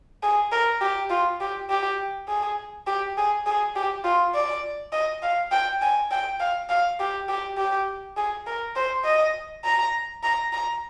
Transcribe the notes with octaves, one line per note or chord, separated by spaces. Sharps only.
G#4
A#4
G4
F4
G4
G4
G#4
G4
G#4
G#4
G4
F4
D5
D#5
F5
G5
G#5
G5
F5
F5
G4
G4
G4
G#4
A#4
C5
D#5
A#5
A#5
A#5